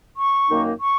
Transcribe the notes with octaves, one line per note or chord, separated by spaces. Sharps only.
C#6
F#2 D#3 A#3 D#4
C#6